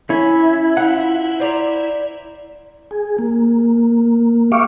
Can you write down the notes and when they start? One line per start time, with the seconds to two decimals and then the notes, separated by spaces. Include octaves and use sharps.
0.10 C#4 E4
0.77 F3 F#5
1.40 C5 D5 A#5
2.91 G#4
3.18 A#3
4.52 G4 E5 F5 C#6 D6